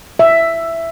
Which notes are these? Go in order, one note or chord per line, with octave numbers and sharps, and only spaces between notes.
E5